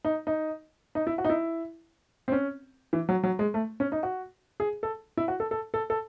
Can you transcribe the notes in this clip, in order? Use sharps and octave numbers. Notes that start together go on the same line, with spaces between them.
D#4
D#4
D#4
E4
F#4
D#4
E4
C4
C#4
E3
F#3
F#3
G#3
A3
C#4
D#4
F#4
G#4
A4
E4
F#4
A4
A4
A4
A4